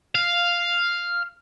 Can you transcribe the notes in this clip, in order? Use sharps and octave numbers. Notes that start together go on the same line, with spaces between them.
F5